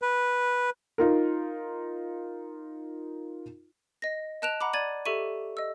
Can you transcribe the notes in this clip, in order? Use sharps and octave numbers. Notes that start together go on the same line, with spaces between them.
B4
D#4 F4 A#4
D#5 A#6
D#5 A5 F#6 D7 E7 F7
F#5 A#5 B5 D6
D5 G#6 A6 D#7 F#7
G4 A4 E5 C#6 D#7
D#5 E6